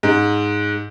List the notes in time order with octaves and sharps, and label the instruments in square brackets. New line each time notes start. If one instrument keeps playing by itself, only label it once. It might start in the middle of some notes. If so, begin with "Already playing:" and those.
[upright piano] G#2